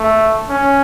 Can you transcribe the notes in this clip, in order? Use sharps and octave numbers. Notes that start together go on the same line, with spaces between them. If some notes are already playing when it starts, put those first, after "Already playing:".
Already playing: A3
C#4